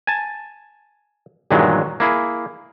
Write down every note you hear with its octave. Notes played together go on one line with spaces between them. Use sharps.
G#5 A5
E2 G2 A#2 D#3 F#3 G#3
A#3 E4 G#4